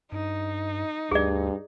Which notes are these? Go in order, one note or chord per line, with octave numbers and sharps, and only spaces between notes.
G2 D#4
D2 G2 G#4 D5